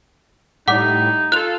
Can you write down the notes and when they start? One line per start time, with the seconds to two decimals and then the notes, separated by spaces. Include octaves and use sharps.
0.68 A2 G3 D#4 F#5 D6
1.32 F4 A4 F#6 F7